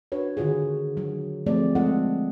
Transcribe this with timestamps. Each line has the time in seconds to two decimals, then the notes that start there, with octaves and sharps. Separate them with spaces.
0.12 D4 F#4 B4 C#5
0.37 D3 D#3 F4 F#4 G#4
0.97 F#3
1.46 F3 A3 C4 G#4 D5
1.75 G#3 C4 F4 A4 D#5 F#5